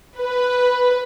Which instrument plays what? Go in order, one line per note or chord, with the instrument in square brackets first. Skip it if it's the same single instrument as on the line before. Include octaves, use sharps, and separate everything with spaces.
[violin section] B4